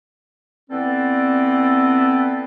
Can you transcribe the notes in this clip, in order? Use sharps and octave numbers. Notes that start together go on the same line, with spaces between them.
E3 B3 C4 A4 B4 D5